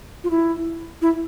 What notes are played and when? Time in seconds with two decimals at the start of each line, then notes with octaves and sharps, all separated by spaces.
0.24 F4
0.30 E4
1.02 E4